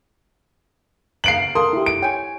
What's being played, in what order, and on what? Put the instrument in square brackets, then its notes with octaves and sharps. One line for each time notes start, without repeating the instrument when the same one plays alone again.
[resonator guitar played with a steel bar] C#3 B3 F5 [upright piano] C7 D7 F#7
[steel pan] A4 A#4 [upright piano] C6 D#6
[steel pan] E4 G4
[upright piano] D7
[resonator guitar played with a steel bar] C#5 G#5 [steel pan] G5